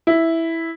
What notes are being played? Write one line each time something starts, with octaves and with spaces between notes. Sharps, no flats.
E4